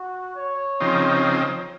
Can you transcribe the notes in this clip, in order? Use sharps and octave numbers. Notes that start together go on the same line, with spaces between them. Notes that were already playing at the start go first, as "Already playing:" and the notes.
Already playing: F#4
C#5
C#3 F3 C4 D#4